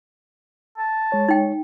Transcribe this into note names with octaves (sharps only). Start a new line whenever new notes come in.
A5
G#3 C#5
D#4 G5